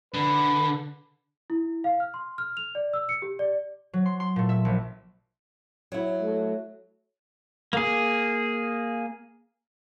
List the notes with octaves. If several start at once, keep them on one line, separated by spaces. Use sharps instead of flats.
D3 B4
E4
F5
F6
C6
F6
F7
D5
E6
C#7
G4
D5
F#3
C6
C6
A#2 A3
E5
A#1
F#3 E4
A3
A#3 G#4